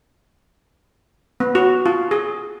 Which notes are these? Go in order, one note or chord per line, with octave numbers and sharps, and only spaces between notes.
B3
F#4
F4
G#4